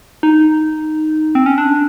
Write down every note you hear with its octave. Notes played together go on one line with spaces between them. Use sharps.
D#4
C4
C#4
D4